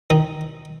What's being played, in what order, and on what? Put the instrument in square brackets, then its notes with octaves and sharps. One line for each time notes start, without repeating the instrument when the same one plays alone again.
[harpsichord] D#3 D#4